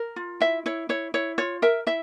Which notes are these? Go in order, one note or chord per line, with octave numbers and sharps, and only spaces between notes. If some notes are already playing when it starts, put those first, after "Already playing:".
Already playing: A#4
F4
E4 E5
E4 C#5
E4 C#5
E4 C#5
F4 C#5
A#4 E5
E4 E5